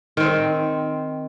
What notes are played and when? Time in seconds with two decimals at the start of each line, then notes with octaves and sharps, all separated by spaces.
0.17 D#3 C4